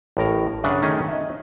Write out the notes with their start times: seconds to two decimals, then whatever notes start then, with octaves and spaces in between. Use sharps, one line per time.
0.17 A1 A2 A#4 A#5
0.64 F#2 C#3 D4 B4 F#5
0.82 D#3 A3 C#4 G#4 D#5
1.08 D#5 E5